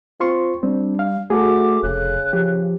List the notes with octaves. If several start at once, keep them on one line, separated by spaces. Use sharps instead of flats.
C4 F4 C6 C#6
G3 C4 D4
F5
A3 F#4 G#4 A4 D6
F1 C#3 F#6
F3 G4